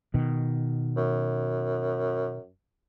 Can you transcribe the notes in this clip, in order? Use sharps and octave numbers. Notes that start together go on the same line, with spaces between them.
B2 D#3
F#2